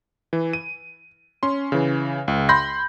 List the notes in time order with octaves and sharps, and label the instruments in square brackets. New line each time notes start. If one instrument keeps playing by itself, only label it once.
[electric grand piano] E3
D#7
C#4 C6
C#3 E3
C#2
B5 C6 G6 A#6